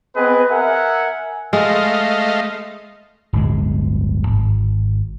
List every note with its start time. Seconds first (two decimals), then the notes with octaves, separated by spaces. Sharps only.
0.16 B3 C4 G#4 B4 D#5
0.50 A#4 E5 F#5 G#5
1.53 G#3 A3 D#5 F5
3.33 D1 G1 G#3
4.27 G#1